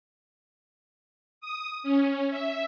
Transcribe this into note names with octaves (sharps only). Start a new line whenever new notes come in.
D#6
C#4
E5